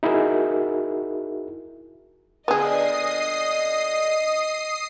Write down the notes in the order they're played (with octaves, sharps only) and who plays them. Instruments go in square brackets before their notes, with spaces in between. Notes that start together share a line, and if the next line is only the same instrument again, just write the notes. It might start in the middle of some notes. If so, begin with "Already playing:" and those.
[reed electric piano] D#4 E4 F#4 G#4 A#4 E5
[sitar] A#2 D3 A3 [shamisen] B3 G#4 [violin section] D#5 [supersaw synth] D#6 C7